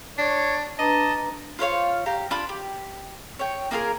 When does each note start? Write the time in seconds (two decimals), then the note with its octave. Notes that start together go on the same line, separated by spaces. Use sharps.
0.18 D4 C#5
0.79 D4 B4 D#5 A5 A#5
1.59 F4 C5 C#5 F5
2.06 G4 F5 A#5
2.31 D4 F4 B5 D6
2.49 G4
3.39 C#5 G5
3.71 A#3 F4 G#4 A#4